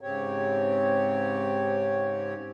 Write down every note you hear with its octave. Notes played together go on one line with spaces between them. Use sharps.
G#2 C#3 C4 G4 C#5